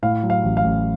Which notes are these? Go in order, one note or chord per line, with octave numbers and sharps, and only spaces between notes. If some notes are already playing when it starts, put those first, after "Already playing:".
A2 F5
F#3
F5
A1
F5
A1